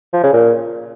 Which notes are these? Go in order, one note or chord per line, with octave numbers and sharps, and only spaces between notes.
F3
C#3
A#2